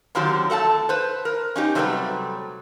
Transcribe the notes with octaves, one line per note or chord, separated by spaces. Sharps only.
D3 D#3 F3 F#3 C4 G4
A3 A4 F#5 A5
B4 C5
A#4
C#4 D#4 G4
C3 F#3 G3 A3 A#4 B4